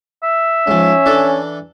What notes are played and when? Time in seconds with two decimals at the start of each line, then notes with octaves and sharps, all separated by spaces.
0.23 E5
0.67 G#2 F3 C#4
1.06 E3 D4 A4